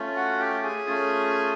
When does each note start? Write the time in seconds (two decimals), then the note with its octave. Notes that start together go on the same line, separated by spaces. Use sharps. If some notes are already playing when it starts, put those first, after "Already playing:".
Already playing: A3 C#4 F4
0.16 F#4 F#5
0.40 G4 G5
0.63 G#4 G#5
0.86 A3 C#4 F4